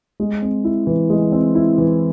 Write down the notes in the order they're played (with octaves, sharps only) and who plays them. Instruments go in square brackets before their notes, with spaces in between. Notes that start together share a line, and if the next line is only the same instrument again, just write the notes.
[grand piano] G#3
C4
E4
E3
G#3
C4
E4
E3